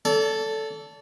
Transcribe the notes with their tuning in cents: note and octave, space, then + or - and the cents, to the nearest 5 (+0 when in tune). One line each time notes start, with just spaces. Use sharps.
A4 +0 D5 -40